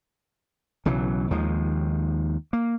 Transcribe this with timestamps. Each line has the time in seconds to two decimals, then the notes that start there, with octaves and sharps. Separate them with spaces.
0.85 B1 C#3 E3 F#3
1.31 D#2 D#3 F3 G#3
2.53 A#3